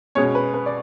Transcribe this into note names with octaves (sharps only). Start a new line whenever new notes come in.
B2 G#3 C#4 C#5
B4
B4
D5